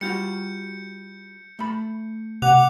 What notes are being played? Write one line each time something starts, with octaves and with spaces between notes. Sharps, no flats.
G3 F4 F#4 G6 C#7
A3 B5
C3 F#5 D6 F#6 F7